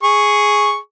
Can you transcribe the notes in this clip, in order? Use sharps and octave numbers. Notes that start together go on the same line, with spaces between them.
G#4 C#6